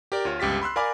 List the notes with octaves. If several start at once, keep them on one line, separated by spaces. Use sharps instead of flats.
G4 A#4 D5
D2 F4 C#5 F6
G1 C#2 G4 A6 B6
B5 C6 E6 F#6
A#4 D5 F5 G#5 B5 D6